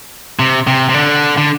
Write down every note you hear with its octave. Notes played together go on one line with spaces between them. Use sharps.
C3
C3
C3
D3
D3